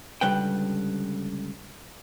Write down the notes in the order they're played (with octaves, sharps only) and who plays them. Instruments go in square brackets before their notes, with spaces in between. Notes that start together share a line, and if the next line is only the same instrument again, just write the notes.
[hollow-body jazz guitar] C#2 D3 G3 B4 G5